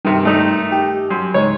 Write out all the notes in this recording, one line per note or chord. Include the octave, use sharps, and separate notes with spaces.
G2 C3 D#3
D#3 A3 D#4
G4
F#2 C6
C#2 G#2 D#4 C#5